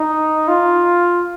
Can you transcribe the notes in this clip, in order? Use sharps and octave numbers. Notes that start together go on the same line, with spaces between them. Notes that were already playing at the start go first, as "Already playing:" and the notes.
Already playing: D#4
F4